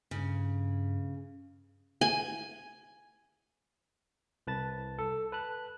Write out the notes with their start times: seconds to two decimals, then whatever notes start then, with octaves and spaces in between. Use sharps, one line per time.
0.11 G2 C#3
2.01 G#5
4.47 C2 B4 A5 A6
4.99 A4
5.32 B4 A5 F#6